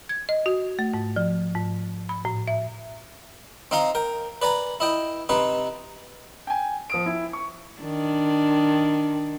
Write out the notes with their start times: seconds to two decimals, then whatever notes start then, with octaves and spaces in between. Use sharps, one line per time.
0.09 G#6
0.29 D#5
0.46 F#4
0.79 A3
0.94 G#2
1.16 F3
1.55 G#2
2.09 B5
2.25 A2
2.48 E5
3.71 C4 D#4 F5 A#5 C6
3.95 A#4 G5
4.42 B4 D5 G#5 A#5
4.80 E4 D#5 G5
5.29 C3 C4 D#4 B4
6.47 G5 G#5
6.90 F3 D#6 D7
7.06 E4
7.33 C#6
7.81 D#3 D4